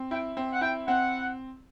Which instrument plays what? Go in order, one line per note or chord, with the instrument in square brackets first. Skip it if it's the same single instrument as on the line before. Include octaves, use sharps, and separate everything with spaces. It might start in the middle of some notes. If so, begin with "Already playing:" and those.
Already playing: [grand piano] C4
[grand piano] E4 [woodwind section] G5
[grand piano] C4
[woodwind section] F#5
[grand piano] E4 [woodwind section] G5
[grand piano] C4 [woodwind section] F#5